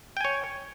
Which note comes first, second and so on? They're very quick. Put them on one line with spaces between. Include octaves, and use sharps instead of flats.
G5 G#5 C#5